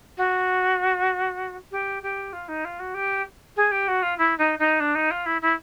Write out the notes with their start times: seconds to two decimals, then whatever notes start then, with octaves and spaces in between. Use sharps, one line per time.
0.17 F#4
1.71 G4
2.02 G4
2.32 F4
2.48 D#4
2.64 F4
2.79 F#4
2.94 G4
3.56 G#4
3.71 G4
3.87 F#4
4.02 F4
4.18 E4
4.38 D#4
4.58 D#4
4.80 D4
4.95 D#4
5.10 F4
5.25 E4
5.41 E4